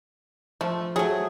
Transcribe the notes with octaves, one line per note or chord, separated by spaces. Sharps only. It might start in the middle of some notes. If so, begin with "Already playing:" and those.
F3 A3
F#3 A3 G#4